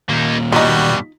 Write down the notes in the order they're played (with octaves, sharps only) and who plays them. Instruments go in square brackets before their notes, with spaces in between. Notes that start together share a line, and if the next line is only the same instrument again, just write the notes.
[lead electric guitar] D#2 A#2 [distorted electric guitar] A#3 D#4
[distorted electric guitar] G2 B2 [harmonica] G3 F#4 [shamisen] D#4 F4